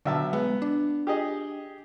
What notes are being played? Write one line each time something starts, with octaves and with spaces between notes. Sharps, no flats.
B1 D3 E5 A5
G#3 B3
D4
G4 G#4 D#5